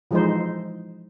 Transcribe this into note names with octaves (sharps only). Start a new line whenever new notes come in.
E3 F3 G#3 D#4 E4 C5